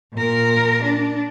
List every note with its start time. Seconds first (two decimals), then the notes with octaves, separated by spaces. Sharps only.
0.14 A#2 A#4
0.83 D4